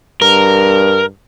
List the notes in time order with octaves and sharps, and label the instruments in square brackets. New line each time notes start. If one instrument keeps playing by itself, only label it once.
[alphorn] G2 [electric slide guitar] A#4